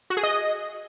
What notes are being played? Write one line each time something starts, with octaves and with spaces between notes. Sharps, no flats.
F#4
G#4
D#5